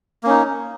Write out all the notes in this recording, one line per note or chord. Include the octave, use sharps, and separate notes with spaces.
A#3 C#4 D#4